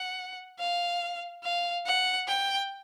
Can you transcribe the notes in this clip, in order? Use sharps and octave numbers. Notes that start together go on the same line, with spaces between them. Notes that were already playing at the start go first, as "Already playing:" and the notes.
Already playing: F#5
F5
F5
F#5
G5